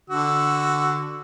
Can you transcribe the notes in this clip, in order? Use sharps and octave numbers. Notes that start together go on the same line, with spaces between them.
D3 F#4 E6